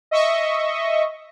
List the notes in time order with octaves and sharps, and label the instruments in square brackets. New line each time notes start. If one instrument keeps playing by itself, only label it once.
[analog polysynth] D#5 E5 C#6